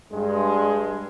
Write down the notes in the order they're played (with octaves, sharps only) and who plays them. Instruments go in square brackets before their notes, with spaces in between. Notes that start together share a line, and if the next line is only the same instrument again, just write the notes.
[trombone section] G2 G#3